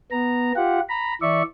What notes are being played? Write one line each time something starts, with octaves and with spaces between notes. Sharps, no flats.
B3 A#5
F4 G4 F#5
A#5 B5
E3 D5 E5 C#6